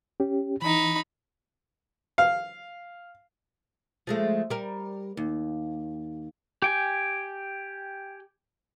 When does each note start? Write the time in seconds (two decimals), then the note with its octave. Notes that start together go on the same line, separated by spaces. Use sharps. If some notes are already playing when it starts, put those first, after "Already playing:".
0.20 C#4 G4
0.62 E3 D#4 B5
2.18 F5
4.07 F3 G#3 A3
4.50 G3 A#4
5.17 D#2
6.62 G4 G5 G#5